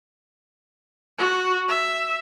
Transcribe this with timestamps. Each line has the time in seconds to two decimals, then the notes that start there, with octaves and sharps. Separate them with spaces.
1.18 F#4
1.69 E5